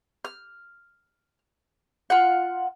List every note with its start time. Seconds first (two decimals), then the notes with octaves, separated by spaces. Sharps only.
0.25 F6
2.10 F4 F#5